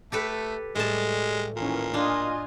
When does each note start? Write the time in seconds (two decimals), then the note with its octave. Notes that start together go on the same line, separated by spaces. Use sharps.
0.12 A3 G4 A4 B4
0.75 A2 G3 G#3 A5
1.57 A#2 D#3 E3 C#4
1.94 D4 F4 D#5 G#5